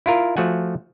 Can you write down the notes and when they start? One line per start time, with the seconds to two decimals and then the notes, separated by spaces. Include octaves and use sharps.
0.06 E4 F4 A#4
0.37 F3 A3 F#4 F#5 G#5